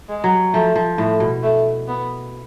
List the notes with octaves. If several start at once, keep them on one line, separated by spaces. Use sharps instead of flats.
G#3
F#3
F3 A3
F3
A2 A3
B2
A3
B3